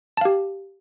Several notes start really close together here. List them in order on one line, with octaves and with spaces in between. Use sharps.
A5 F5 G4